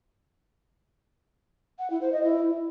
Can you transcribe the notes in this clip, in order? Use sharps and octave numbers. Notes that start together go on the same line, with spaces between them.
F#5
E4
C5
D#5
E4